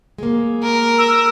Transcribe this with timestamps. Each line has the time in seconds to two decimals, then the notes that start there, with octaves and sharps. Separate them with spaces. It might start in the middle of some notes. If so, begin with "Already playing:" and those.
0.18 G#3 A#3
0.63 A#4
0.98 E6